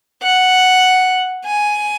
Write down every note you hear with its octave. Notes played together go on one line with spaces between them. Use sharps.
F#5
G#5